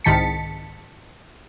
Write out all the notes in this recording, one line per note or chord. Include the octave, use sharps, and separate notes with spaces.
C2 G#2 D#3 A5 B6 C#7